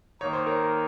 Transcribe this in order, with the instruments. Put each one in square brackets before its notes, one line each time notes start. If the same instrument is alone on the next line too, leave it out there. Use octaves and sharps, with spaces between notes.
[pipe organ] D#3 A#3 D#4 [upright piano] C#5
[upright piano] C5
A#4 C#5